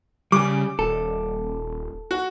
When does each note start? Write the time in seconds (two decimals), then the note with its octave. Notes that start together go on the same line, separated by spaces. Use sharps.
0.32 C#3 G3 G#4 D6
0.79 D#1 A4
2.11 F#4